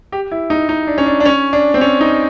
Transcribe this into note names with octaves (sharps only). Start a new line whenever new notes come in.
G4
E4
D#4
D#4
D4
C#4
D4
D4
C#4
D4
C4
C#4
D#4